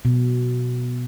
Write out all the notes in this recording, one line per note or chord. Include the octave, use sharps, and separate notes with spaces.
B2